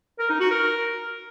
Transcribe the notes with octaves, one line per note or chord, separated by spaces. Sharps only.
A#4
D#4
F#4
A#4